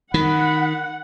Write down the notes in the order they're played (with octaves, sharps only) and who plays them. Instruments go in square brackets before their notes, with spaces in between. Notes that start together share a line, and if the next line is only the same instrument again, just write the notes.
[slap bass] D#3 [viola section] F#5 [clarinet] B5